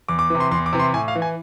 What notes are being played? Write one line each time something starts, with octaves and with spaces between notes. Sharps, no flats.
E2 D6
D6
C3 E3
C6
E2 C6
D6
C3 E3
C6
A2 G#5
F5
E3
G#5